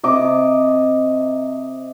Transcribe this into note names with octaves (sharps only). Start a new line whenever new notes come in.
C3 D#5 D6